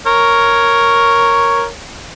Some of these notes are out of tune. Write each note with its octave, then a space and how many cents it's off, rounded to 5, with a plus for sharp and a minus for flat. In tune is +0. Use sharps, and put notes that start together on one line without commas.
A#4 +0 C#5 +0